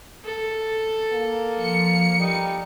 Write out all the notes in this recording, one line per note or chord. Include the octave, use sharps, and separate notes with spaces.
A4
A#3
F3 C#7
G3 D#4